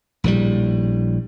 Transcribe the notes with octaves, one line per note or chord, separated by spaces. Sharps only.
A#1 A2 D#3 G3